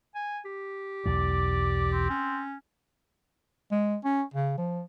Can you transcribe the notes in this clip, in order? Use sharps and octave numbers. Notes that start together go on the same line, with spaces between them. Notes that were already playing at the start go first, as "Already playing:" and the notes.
G#5
G4
B1 E2 E3 D5
C4
C#4
G#3
C#4
C#3
F3